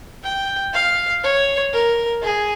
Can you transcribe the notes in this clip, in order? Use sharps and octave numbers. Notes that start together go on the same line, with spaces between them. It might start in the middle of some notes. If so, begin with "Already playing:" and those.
G5
F5
C#5
A#4
G#4